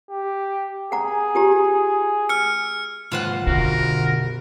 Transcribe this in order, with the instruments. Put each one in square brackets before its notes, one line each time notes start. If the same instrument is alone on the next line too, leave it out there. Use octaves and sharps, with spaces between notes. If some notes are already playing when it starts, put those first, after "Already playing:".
[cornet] G4
[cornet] G#4 [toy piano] F#5 A#5
[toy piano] F4 G4 A#5
[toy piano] E6 [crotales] F6 C#7
[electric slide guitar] G#2 D#3 B4 [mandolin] F4 C5 F#5
[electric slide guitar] B2 D#3 F#4 [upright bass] D3 [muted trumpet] A#4